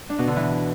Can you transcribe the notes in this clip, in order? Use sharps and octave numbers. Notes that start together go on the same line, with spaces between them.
D4
B2
D3
E3